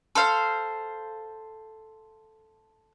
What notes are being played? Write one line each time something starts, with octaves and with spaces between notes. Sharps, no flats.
A4 C5 F5